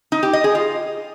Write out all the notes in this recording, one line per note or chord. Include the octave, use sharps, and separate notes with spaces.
D#4
G4
D#5
G#4
F4